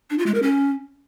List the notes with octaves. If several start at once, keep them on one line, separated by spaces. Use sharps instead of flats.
D4
F4
G#3
A#4
C#4